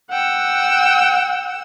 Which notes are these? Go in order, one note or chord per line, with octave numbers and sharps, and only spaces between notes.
F#5 G5 E6